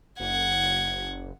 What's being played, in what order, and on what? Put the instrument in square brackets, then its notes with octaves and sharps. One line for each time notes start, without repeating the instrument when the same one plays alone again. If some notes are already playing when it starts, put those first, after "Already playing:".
[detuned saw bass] F#1 [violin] F#5 G#6